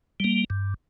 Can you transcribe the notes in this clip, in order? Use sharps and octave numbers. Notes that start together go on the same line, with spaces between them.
G3 A#3
G2